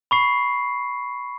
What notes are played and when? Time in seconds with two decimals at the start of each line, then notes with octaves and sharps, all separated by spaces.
0.11 B5 C#6 C7